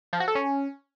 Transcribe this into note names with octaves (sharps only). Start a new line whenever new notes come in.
F3
F#4
A4
C#4